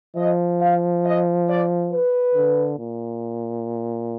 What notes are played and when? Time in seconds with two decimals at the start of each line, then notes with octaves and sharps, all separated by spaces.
0.16 F3 D#5
0.60 F5
1.04 D#5
1.48 D5
1.91 B4
2.35 D3
2.79 A#2